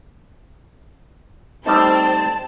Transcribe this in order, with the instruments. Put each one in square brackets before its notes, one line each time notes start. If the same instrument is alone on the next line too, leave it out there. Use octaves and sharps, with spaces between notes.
[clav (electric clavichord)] G3 A3 D#4 [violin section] C4 [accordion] A5